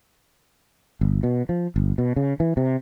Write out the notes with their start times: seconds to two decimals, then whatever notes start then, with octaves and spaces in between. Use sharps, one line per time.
1.01 G1
1.23 B2
1.49 F3
1.76 G1
1.98 B2
2.16 C#3
2.40 E3
2.57 C3